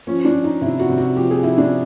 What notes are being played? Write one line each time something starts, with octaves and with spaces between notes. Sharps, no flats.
F3 C#4
D4
F3
D#4
C3 E4
F#4
C3
F#4
F3 G4
G#4
F3 E4
D4